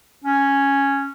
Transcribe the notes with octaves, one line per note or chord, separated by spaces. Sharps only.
C#4